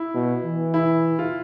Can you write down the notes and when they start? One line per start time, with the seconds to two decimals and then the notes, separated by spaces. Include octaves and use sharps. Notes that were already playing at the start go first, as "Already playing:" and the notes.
Already playing: E4
0.14 B2
0.44 E3
0.74 E4
1.19 F4